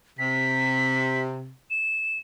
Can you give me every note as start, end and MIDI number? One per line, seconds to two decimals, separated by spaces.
0.19 1.52 48
0.19 1.22 95
1.70 2.19 100